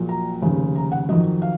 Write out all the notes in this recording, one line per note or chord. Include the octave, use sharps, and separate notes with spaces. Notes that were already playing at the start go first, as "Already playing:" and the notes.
Already playing: A#1 A#2 F#3
A#5
F1 D#2 C#3
A#5
F#5
F2 D#3 F#3 D#5
F5